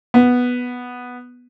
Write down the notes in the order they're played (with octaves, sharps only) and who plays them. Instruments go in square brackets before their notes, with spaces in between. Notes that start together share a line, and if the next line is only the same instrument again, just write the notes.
[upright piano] B3